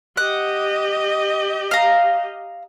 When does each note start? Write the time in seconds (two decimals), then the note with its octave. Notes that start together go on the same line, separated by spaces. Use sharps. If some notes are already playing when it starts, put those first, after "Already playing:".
0.17 G4 D#5 F#5
1.71 F5 A#5